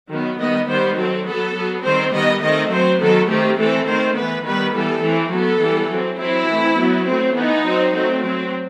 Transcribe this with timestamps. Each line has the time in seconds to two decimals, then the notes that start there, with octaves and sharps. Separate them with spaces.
0.11 D#3 F#3 B3
0.40 D#3 G3 B3 D#5
0.68 D#3 G3 B3 C5
0.97 F#3 C4 A4
1.26 F#3 B3 A4
1.55 F#3 B3
1.84 D#3 G3 C4 C5
2.13 D#3 G3 B3 D#5
2.42 D#3 A3 C4 D#5
2.71 F#3 C4 C5
3.00 D#3 F#3 B3 A4
3.29 D#3 A3 C4 G4
3.58 E3 A3 C4 A4
3.87 D#3 A3 C4 C5
4.16 B3 B4
4.21 E3
4.45 D#3 G3 B3 B4
4.74 E3 G3 B3 A4
5.03 E3 A3 C4
5.32 F#3 B3 A4
5.61 E3 G3 B3
5.90 F#3 C4
6.19 F#3 C4 E4
6.48 E3 A3 C4
6.77 F#3 B3
7.07 F#3 A3 C4
7.35 E3 B3 D#4
7.65 F#3 C4
7.93 F#3 A3 C4
8.22 F#3 C4